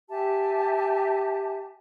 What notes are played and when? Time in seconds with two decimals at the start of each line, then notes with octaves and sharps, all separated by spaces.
0.10 G4 E5 G#5 A5